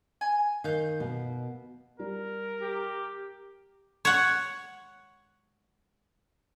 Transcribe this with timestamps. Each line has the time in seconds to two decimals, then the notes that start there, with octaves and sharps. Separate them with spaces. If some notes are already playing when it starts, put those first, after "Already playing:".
0.21 G#5
0.64 D#3 F5 G6
1.00 B2
1.99 G3 A#4
2.62 G4
4.05 C#5 F#5